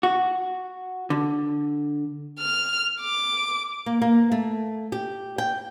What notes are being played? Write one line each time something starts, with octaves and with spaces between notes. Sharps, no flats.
F#4
D3
F6
D6
A#3
A#3
A3
G4
G5